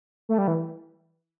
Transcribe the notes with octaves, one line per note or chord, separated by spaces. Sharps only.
A3
G3
E3